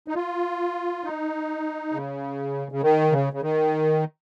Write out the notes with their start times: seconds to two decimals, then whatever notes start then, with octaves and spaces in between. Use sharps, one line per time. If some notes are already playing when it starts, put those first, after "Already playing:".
0.08 D#4
0.15 F4
1.04 D#4
1.93 C#3
2.72 C#3
2.83 D#3
3.12 C#3
3.33 C#3
3.42 D#3